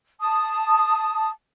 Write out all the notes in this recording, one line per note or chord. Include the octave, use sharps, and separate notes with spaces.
A5 D#6